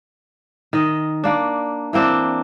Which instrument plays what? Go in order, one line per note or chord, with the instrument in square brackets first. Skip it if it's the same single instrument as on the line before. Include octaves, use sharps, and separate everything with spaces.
[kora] D#3 D#5
A#3 D4
E3 A#3 C4 D4